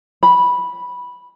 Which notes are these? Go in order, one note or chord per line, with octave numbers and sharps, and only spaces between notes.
B5